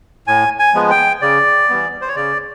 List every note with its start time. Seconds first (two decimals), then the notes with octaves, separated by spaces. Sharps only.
0.27 A2 G#5
0.59 G#5
0.74 F3 G#3 B3
0.91 G5
1.22 C#3 D5
1.69 E3 G3 B3
2.01 C5
2.08 C#5
2.16 C#3 D5